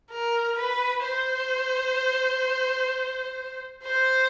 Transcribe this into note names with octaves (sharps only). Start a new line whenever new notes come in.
A#4
B4
C5
C5